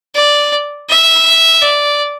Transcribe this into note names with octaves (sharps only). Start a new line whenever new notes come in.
D5
E5
D5